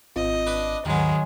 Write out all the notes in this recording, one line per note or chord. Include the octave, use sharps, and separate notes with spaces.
G#1 C4 F4 D#5
D4 B4
D#2 G#2 D#3 F#3 G#3 B3 G#4